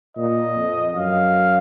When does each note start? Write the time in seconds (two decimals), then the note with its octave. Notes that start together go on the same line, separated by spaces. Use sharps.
0.17 A#2 D#5
0.56 F2
0.95 F#2 F5